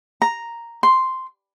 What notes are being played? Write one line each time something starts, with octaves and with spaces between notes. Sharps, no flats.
A#5
C6